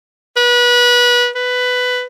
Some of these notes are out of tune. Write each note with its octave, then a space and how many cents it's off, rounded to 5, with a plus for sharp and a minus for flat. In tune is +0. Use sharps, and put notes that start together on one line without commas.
B4 -25
B4 +15